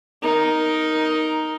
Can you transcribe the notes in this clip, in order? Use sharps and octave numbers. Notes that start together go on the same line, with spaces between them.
D#4 A#4